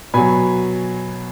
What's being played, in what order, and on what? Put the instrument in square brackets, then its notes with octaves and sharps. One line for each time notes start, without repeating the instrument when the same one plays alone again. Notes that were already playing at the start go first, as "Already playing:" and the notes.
[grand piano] B2 F#3 G#5 B5